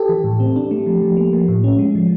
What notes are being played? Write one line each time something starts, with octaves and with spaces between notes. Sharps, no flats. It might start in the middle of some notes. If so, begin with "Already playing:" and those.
Already playing: G4 A4
E3
A2
C4
D4
A3
F3
F3
A#3
F3
A2
C#4
G#3
F3